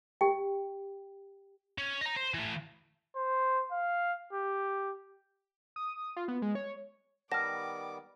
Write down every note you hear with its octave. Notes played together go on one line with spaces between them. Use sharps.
G4 G5
C#4
D#5 A#5
C5
E3 A3
C5
F5
G4
D#6
F4
B3
G#3
C#5
D#3 G3 B3 F#5 A5 D6 F6 A#6